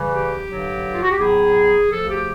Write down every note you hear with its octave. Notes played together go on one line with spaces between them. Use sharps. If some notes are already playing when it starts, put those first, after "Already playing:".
Already playing: C#3 E3 G3
G4
G2 D3 F#3
F4
F#4
G4
A2 F#3 B3 E4 G#4
D2 C#3 F3 A4
G4